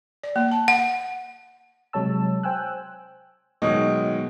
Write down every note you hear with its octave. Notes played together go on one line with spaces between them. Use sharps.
D5
A#3
A5
F#5
C3 F#3 G#3 C#5 A5 E6
C5 G5 G#5 E6 F#6
B2 D#3 F#3 G#3